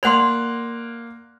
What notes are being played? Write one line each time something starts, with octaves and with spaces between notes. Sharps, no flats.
A#3 D5 F#5 C6 F#6 F7